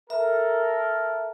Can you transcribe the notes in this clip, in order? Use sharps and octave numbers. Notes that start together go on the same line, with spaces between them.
A4 A#4 E5